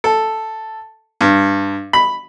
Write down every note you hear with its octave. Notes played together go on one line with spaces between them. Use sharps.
A4
G2
B5